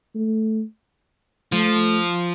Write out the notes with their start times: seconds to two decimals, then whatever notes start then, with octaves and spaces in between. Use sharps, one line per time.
0.15 A3
1.52 F3 A3